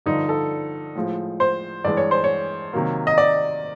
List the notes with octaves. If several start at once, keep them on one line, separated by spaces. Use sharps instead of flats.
G2 D3 F3 D#4
A4
A2 F3 G#3
C5
G2 E3 G#3 D5
C#5
C5
C#5
C3 D#3 F#3 A#3
D#5
D5